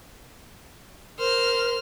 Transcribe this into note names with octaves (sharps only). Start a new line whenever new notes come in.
A#4 C5 F6